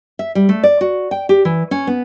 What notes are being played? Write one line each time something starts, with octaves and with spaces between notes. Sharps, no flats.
E5
G3
A3
D5
F#4
G5
G4
E3
C#4
B3